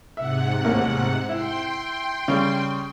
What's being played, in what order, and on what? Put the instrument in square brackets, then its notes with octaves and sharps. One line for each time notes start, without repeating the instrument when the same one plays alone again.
[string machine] G#2 C3 F#5 [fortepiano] E5
[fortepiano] A1 D#2 A#3
[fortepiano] E4 [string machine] G5 C6
[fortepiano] C#3 G3